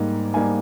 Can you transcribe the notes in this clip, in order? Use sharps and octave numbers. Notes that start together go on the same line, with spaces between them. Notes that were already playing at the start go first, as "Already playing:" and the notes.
Already playing: G#2 G3 A#3 D#4
G3 A#3 D#4 G#5